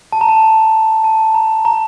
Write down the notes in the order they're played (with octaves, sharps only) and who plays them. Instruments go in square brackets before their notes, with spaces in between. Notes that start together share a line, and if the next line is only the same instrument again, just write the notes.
[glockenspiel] A5
A#5
A5
A5
A#5
A#5